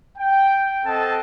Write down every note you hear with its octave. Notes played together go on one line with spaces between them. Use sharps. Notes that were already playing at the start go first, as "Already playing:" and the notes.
G5
C4 A4 D#5 F#5 A5